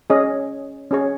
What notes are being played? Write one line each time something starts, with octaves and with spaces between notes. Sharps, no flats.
C#4 G#4 C#5 D#5
C#4 G#4 C#5